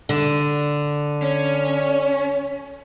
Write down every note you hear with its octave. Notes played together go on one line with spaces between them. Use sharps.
D3
C#4